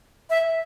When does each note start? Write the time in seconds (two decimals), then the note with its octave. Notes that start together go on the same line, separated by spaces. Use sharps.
0.30 E5